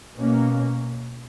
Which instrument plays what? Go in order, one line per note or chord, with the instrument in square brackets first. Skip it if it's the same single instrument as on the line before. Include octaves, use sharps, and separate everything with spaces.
[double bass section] B2 A#3 C#4